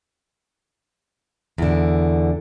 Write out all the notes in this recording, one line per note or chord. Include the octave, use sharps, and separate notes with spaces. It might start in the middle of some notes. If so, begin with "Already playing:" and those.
E2 D3